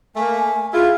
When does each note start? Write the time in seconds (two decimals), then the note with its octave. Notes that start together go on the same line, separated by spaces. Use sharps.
0.16 A3 A#3 G#5
0.73 E4 F4 G#4